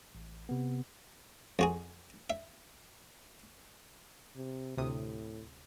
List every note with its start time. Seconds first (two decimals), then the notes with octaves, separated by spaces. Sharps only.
0.15 A1
0.49 C3 B3
1.59 F2 F#4 G#4
2.30 E5
4.36 C3
4.77 D2 A2 C3 D#6